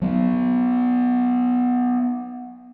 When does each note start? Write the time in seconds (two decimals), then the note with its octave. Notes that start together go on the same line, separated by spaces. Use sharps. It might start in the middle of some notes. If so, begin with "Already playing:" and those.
0.02 F#3 B3